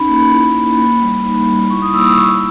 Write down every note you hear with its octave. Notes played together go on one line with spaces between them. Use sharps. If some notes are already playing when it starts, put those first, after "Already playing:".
Already playing: C#4 D#4 B5
A#3
E4
A#3
A#3
G3
D#4
G3
E4 C#6
D#6
A#3 E6
D#6
A#3 C#6